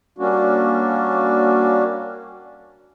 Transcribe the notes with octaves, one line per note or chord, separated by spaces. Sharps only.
G3 A#3 C#4 D4 F#4